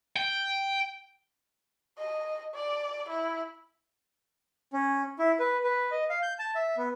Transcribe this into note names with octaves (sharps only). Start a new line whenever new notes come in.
G5
D#5
D5
E4
C#4
E4
B4
B4
D#5
F5
G6
A5
E5
B3